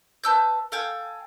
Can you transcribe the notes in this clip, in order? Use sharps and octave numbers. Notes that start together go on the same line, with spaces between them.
B4 A5 E6 G6
A4 F5 G5 G#5